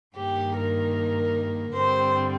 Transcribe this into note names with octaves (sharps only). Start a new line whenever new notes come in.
G2 D#3 A#3 G4
A#4
G2 D3 G3 C4 C5